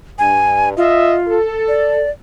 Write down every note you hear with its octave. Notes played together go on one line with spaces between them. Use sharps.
G2 G#5
F4 D#5 E5
A4
D5